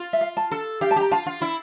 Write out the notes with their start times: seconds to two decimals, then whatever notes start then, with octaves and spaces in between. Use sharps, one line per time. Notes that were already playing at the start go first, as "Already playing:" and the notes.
Already playing: F4
0.13 E5
0.21 F5
0.37 A5
0.51 A4
0.81 G4 F5
0.91 A5
0.96 G4 A#5
1.11 F4 A5
1.26 F4
1.42 E4